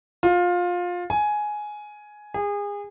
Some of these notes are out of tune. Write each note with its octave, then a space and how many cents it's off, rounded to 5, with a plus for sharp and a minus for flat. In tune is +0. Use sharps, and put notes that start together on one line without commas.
F4 +20
G#5 +10
G#4 -30